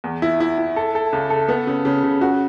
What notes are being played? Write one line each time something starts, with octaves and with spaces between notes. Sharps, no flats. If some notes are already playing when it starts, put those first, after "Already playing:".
E2
E4
E4
E4
A4
A4
C#2
A4
B3
C#3
C#3
C#3
F#4